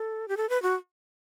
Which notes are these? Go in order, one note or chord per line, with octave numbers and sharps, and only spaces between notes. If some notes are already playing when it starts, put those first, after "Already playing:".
Already playing: A4
G4
A4
B4
F#4